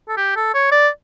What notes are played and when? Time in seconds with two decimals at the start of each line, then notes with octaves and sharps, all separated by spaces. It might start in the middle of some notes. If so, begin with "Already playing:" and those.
0.08 A4
0.17 G4
0.36 A4
0.54 C#5
0.72 D5